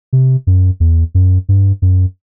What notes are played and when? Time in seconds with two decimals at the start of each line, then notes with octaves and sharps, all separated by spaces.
0.13 C3
0.47 F#2
0.80 E2
1.15 F#2
1.49 G2
1.82 F#2